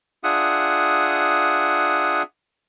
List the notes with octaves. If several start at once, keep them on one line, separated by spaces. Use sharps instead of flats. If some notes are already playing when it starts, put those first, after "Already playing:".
D4 F4 G#4 E5 F#5 D#6